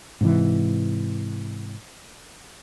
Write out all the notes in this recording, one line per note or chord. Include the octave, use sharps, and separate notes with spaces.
G#2 C3 E3